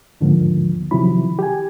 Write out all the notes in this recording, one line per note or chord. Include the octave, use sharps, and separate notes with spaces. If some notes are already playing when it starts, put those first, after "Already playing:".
D#2 G#2 D3 F3 A#3
C3 D#3 F3 F#3 E4 B5
G4 G#5